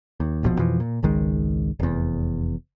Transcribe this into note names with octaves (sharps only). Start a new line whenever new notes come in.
D#2
D1 A#1 B2 F3
F2 B2 E3 F3
A#2
G#1 C#2 D#3 G#3
F1 E2